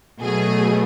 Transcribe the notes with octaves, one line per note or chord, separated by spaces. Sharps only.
B2 F#3 A3 G#4